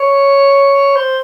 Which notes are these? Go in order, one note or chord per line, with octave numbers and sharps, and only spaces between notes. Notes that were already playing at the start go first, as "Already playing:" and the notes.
Already playing: C#5
C5